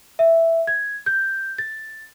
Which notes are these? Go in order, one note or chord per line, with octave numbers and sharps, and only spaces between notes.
E5
G#6
G6
A6